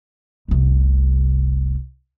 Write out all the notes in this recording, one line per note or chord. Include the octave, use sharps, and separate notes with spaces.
F1 C2